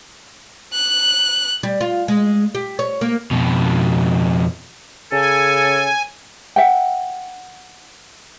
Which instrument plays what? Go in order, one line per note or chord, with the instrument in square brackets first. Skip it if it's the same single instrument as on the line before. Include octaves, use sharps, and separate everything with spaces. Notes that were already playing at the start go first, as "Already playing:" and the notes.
[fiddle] F#6
[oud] G3
F4
G#3
G4
C#5
A#3
[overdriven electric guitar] F2 B2
[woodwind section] C#3 A4 [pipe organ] G#5
[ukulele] E5 F#5 G5